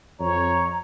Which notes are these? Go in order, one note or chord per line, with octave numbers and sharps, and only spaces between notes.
F2 C#5 A#5